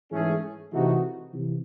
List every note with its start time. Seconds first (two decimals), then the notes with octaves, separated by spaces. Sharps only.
0.11 G#2 E3 A3 C#4 G#4
0.73 C3 E3 A3 D#4 F#4
1.34 C3 E3